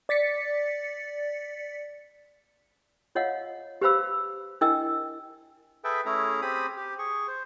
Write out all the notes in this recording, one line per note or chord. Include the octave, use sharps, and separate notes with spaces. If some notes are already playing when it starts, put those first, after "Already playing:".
D5 A6 B6 C#7
F4 C#5 D#5 F5 F#5
G4 B4 C5 F5 B5 E6
D4 E4 A#4 D#5 G5 E6
G#4 A4 B4 E5 G5
A3 C#4 E4 G#4 A#5
C4 G4 G#4 B5 D#6
G4
G#4 C#6
C5